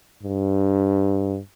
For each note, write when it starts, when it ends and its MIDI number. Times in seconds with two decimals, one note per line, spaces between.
0.23 1.38 43